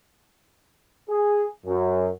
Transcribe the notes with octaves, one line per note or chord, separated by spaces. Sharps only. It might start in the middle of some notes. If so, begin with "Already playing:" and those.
G#4
F#2